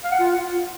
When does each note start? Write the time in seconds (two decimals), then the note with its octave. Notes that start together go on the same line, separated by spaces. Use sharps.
0.04 F5
0.12 F#5
0.19 F4